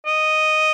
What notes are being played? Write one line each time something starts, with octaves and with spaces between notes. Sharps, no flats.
D#5